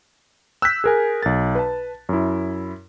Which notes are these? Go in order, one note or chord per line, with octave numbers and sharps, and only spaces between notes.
E6 F#6 G6 B6
G#4 A#4 G#5
B1 A6
B4 A5
F#2 E4